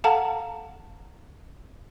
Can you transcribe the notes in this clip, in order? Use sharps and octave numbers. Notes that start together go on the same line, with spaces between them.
A4 F5 F#5 A5 A#5